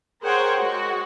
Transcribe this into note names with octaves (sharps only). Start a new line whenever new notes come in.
G#4 A#4 C5 C#5 F#5 G5
G#3 F#4